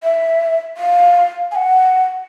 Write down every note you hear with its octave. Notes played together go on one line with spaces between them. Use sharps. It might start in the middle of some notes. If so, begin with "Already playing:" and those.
E5
F5
G#5
F#5